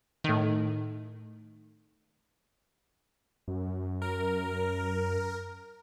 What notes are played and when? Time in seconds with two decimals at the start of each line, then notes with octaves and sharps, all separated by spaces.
0.24 A2 D#3
3.48 F#2
4.02 A#4